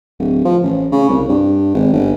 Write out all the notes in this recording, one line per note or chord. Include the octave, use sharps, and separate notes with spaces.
D1
F3
A1
C#3
C2
G2
G#1
G1